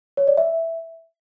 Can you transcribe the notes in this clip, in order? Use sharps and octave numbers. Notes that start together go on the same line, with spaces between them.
C#5
D5
E5